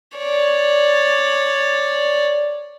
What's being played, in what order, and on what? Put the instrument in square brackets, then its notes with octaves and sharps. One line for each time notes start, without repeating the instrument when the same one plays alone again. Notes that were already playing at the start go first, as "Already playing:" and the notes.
[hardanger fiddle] C#5 D5